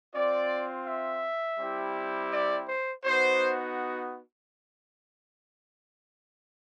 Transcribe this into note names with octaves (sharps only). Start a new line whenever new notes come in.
C4 F4 D5
E5
G3 C4 E4 G4
D5
C5
B3 D#4 F#4 C5